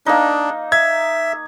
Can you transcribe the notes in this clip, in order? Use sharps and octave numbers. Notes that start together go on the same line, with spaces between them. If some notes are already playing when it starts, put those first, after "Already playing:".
A#3 D4 D#4
E5 G#6